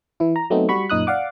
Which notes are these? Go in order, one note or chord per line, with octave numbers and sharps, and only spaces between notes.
E3 E4
A#5
F#3 A3 B3 C4 D#4
G3 F#4 B5 C#6
F#2 A#2 D#4 D#6 F#6
D5 F5 F#5 D6